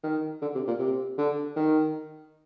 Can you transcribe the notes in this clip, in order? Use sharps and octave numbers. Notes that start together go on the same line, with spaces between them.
D#3
D3
C3
A#2
C3
D3
D#3